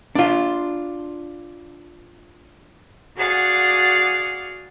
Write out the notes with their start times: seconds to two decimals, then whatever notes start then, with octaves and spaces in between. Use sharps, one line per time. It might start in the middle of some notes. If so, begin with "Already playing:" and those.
0.15 D4 F4
3.16 F#4 G#4 D5 F5 F#5